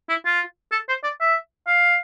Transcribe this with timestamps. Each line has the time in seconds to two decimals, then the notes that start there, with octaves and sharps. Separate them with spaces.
0.09 E4
0.26 F4
0.72 A4
0.88 C5
1.04 D5
1.20 E5
1.67 F5